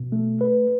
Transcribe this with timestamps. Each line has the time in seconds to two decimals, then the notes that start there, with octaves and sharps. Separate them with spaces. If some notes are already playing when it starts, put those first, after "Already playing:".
Already playing: B2
0.12 A3
0.41 B4